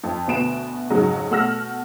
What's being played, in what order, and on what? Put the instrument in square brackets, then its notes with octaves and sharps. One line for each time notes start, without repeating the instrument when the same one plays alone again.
[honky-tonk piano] F2
D2 B2 B3 D7 E7
F2 G#2 C#3 F#3
B2 A3 F#5 E6 F6 A#6